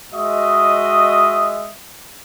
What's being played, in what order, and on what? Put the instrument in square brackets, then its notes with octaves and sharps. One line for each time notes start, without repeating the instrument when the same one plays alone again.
[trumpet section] G#3 F#4 D#5 E5 D#6